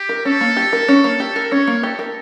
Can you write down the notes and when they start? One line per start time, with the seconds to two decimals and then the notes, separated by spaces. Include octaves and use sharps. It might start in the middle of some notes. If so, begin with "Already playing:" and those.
Already playing: G4
0.09 A#4
0.25 C#4 A4
0.41 A#3
0.57 G4
0.73 A#4
0.88 C#4
1.04 A#3
1.20 G4
1.36 A#4
1.52 C#4 C#5
1.67 A#3
1.83 G4 A4
1.99 A#4